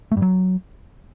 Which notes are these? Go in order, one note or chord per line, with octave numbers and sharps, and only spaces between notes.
A3
G2
F#3